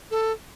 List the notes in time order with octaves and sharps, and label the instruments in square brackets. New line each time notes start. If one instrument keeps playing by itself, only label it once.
[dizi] A4